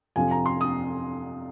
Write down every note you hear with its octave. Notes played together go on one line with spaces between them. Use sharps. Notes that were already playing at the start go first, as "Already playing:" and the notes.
F2 C3 F3 G#5
A#5
C6
D#6